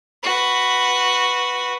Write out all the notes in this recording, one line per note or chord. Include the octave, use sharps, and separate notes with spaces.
F#4 B4